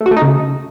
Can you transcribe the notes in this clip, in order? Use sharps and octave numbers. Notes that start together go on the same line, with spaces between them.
A3
F#4
A3
D#4
C#3